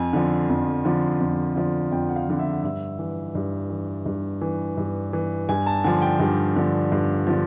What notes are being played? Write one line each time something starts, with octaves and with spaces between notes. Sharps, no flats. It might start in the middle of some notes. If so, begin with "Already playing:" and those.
Already playing: F2 G#5
D3 F3
F2
D3 F3
F2
D3 F3
F2 G5
F#5
F5
D3 F3
E5
G2 E5
E3
G2
E3
G2
E3
G2
E3
G2 G#5
A5
D3 F3 G#5
G5
G2
D3 F3
G2
D3 F3